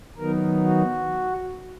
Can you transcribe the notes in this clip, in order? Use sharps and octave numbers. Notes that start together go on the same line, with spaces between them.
D#3 F#3 B3 D#4 A#4
F#4